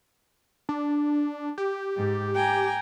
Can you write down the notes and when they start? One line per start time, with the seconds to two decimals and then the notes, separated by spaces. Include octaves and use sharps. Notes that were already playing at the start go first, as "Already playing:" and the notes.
0.69 D4
1.58 G4
1.96 G#2
2.35 G5 G#5 A#5